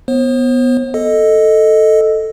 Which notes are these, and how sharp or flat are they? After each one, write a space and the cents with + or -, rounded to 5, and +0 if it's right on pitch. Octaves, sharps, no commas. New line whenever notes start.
B3 +0 C5 +40
A4 +0 D#5 +0